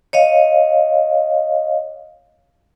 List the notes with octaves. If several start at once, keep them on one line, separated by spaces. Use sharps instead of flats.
C#5 D#5 F5